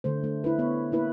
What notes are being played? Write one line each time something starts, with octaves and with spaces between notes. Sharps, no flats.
D3 A3 C5
A3
E4 B4
B3 C#5
A#3 E4 B4